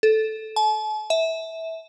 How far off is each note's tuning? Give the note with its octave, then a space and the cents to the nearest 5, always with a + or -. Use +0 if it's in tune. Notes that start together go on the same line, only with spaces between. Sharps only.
A4 -10
A5 -45
E5 -20